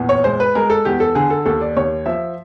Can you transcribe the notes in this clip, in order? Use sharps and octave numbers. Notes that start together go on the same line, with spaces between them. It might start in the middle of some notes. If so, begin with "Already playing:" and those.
Already playing: E2 A#2
C#5
G#3 C5
B4
G#3 A#4
A4
E2 G4
A4
D3 G#4
A4
D#2 A4
D5
D#2 C#5
F3 E5